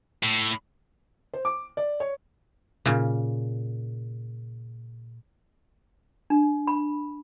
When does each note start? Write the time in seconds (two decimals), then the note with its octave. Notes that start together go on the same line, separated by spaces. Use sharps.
0.23 A2
1.33 C5
1.45 D6
1.77 D5
2.00 C#5
2.86 A#2 C#3
6.30 D4
6.67 B5